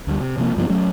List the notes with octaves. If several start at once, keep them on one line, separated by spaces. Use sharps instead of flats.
D2 G3
C3
C3 F3 A#3
G2 F3 G3 B3
F#3 A3 C#4